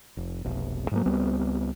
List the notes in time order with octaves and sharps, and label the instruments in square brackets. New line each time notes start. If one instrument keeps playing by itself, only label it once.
[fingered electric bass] F1
F1 B1
G#2 F#3 A#3
C#2 G3 B3 C4